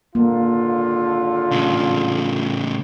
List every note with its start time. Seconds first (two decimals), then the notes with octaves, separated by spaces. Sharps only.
0.15 G#1 D3 A#3 F4
1.51 A2 C#3